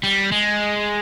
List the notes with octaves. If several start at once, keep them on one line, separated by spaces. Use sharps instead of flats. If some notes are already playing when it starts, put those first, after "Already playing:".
G3
G#3